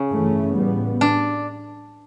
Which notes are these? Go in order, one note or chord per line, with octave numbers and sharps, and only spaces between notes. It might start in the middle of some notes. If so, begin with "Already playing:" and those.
Already playing: C#3
G2 E3 A3 C#4
A2 G3 B3
D4